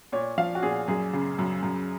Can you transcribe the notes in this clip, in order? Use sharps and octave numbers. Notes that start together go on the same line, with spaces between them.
A#2 C#5
F3 F5
F#4
A#2 G#4
F#2 G#4
C#3
F#2
F#2